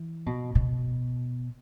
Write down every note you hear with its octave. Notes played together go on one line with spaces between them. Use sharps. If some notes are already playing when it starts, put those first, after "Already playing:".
Already playing: E3
B2
B2